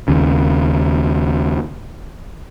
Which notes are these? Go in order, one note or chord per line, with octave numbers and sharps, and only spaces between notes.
D#2 C#3